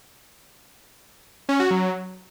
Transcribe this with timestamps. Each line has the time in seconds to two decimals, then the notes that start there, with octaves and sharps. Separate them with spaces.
1.49 C#4
1.60 F#4
1.71 F#3